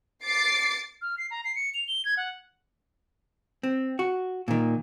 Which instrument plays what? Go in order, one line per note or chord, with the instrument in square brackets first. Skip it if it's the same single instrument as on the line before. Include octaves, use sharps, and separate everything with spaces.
[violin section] D6 A6 C7 D7
[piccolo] F6
C7
A#5
C7
C#7
F7
G7
G#6
F#5
[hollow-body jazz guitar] C4
F#4
A#2 D#3